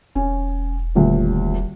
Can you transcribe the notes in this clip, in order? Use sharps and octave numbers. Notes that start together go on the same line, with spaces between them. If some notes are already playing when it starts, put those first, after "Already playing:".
E1 C#4
D#1 D2 A#2